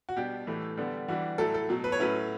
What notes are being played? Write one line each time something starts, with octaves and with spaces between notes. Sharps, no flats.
F#4
B2 G3 D4 G4
A2 E3 A3
D3 G3 B3
E3 G3 D4 F#4
A2 F#3 A3 E4 A4
A4
B2 F#3 A3
B4
C#5
A2 F#3 C#4 E4 B4